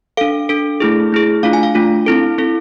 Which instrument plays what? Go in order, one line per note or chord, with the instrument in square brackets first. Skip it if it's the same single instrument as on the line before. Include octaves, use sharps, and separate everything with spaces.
[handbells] D4 A4 F5
D4 A4
A3 E4 G#4
A3 E4 G#4
A3 D4 F4 F5
G#5
F5
A3 D4 F4
C4 E4 A4
C4 E4 A4